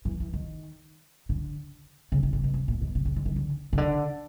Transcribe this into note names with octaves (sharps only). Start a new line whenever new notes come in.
E3
E3
D#3
D3
C#3
D3
C3
B2
C3
A#2
B2
C3
C#3
D3
D#3
D3
C#3
D3